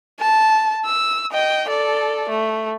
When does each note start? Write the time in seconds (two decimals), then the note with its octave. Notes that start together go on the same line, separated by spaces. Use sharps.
0.20 A5
0.86 E6
1.32 D#5 G5
1.69 A4 D5
2.29 A3